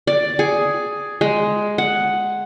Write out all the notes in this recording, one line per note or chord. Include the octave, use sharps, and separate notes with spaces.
D5
G#4
G#3
F#5